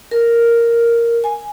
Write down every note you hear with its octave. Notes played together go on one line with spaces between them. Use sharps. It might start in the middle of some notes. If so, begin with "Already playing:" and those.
A#4
G#5